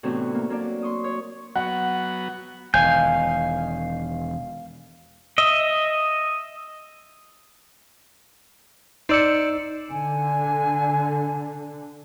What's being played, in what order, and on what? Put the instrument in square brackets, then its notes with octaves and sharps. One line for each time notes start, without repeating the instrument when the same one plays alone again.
[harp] A2 C3 E3 B3 D4 F#4
A#3
F#3 A#3 D4 D5
C6 C#6 D#6
C#5
[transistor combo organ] F#3 B3 F#4 [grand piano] F#5
[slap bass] E1 D#3 [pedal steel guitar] F5 G6 [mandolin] G#5
[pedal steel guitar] D#5 E5
[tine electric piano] D#4 E6 C#7 [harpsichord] C5 D5
[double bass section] D3 [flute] G#5